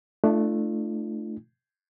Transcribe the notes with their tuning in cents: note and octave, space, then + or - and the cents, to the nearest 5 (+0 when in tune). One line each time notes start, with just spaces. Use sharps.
A3 +0 D4 +25 F4 -30